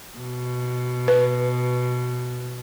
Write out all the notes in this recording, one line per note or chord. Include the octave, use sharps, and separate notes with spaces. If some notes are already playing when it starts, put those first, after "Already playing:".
B2
B4